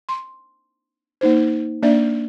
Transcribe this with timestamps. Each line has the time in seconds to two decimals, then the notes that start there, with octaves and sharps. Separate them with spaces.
0.09 C6
1.21 A#3 D#4 C5
1.82 A#3 D4 D5 E5